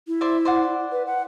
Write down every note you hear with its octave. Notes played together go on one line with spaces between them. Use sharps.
E4
C5 D5 E5
C5 D5 F#5
B4
F#5